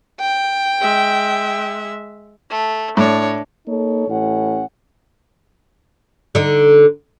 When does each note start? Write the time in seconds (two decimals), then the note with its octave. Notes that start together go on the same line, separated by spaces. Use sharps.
0.20 G5
0.81 G#3 E5
2.50 A3
2.97 A2 D4 C#5
3.68 A#3 D#4 A4 C#5
4.08 A1 A2 C#4 F#5
6.35 D3 D#4